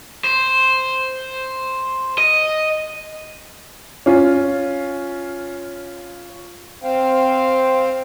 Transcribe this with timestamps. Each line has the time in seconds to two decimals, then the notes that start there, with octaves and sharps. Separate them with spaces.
0.24 C5
2.18 D#5
4.06 C#4 F4
6.83 C4 C5 F5 G5